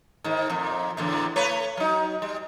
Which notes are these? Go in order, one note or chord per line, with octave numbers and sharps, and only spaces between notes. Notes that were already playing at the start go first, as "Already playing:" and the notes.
G#2 D#3
F2 A#2
E2 A2 D3
A3 B4 C#5
F#3 D#4
G3